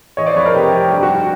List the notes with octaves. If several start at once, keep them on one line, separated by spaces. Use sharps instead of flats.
E3 C#5 D#5
C5 D5
F2 B4 C#5
A#4 C5
C3 G4
F1 G4
G2 G4
F#4